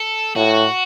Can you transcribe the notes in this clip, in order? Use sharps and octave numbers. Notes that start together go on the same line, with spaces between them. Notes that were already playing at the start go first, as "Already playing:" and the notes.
Already playing: A4
A2 F#4